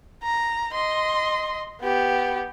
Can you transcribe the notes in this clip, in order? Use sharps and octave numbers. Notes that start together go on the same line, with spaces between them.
A#5
D#5 C6
B3 G4